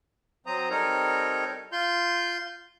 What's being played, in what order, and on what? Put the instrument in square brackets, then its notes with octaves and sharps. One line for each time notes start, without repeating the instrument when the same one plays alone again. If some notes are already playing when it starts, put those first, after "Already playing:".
[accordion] F#3 C4 C5 A#5 D#6
G3 C4 D#4 A4 A#4 C#5
F4 C6 G6